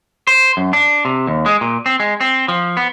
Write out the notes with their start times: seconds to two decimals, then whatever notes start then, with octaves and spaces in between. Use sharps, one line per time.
0.27 C5
0.57 F#2
0.73 D4
1.05 C3
1.27 D#2
1.46 G#3
1.61 A#2
1.86 C4
2.00 G#3
2.21 C4
2.48 F3
2.77 B3